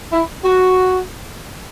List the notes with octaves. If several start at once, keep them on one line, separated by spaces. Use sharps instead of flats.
E4
F#4